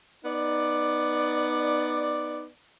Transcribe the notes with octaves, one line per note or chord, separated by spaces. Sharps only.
B3 D#4 D5